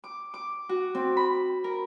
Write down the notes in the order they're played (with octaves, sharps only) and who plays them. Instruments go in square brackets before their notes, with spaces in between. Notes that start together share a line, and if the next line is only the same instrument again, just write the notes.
[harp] D6
D6
F#4
C4
B5
A#4